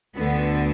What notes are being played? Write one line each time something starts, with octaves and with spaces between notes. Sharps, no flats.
D2 D3 A3 B3